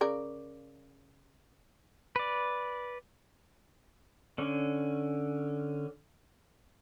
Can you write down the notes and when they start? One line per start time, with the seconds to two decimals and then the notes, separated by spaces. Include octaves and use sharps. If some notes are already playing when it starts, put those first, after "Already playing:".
0.01 C#3 A#4 D5
2.16 B4 D5
4.38 D3 C#4